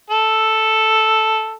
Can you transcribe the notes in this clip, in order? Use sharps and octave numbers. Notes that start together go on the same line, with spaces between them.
A4